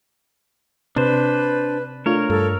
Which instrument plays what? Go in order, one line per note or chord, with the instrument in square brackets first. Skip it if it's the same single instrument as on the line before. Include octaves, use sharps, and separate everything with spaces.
[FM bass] C3 [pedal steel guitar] D4 C5 [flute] B4
[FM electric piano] A3 D4 F4 [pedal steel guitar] A#4 C#5
[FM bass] G2 [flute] A4